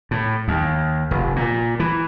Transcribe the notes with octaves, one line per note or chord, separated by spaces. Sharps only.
A2
D#2
F1
A#2
E3